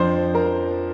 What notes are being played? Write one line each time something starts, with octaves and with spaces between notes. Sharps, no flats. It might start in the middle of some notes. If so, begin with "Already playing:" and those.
Already playing: F2 F3 D4 C5 C6
A#4 A#5